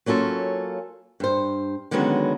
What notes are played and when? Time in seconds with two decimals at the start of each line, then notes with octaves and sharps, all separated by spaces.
0.06 F#3 A#3 C#4 F4 A4
1.20 G2 C5
1.91 D3 D#3 F#3 G#3 B3 C#4